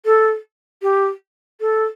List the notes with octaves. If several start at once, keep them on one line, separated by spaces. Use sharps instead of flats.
A4
G4
A4